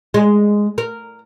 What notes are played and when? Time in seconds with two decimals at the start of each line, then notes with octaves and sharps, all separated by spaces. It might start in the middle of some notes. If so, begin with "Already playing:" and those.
0.14 G#3
0.78 A#4